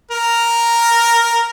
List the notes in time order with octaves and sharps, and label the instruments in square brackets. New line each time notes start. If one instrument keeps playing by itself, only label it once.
[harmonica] A#4